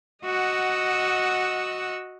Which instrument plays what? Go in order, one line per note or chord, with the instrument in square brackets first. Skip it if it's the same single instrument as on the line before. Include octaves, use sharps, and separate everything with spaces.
[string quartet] F#4 D#5 F#5 E6